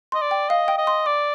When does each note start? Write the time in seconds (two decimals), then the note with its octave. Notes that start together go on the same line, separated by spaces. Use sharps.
0.12 D#5 C6
0.21 D5
0.31 G5
0.49 D#5 F5
0.68 G5
0.78 D#5
0.87 C6
1.06 D5 D6